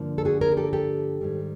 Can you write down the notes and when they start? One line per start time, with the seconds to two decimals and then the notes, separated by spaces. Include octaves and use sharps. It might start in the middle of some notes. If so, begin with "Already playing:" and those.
Already playing: G2 D3 F3 A#3
0.18 A4
0.25 F#4 G#4
0.41 G#4 A#4
0.52 G#4
0.57 G4 A4
0.73 G4 A4
1.21 G#2 D#3 G3